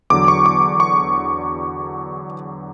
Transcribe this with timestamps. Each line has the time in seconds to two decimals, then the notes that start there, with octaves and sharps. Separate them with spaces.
0.10 E2 D3 F#3 D6
0.28 C#6
0.46 D6
0.80 C#6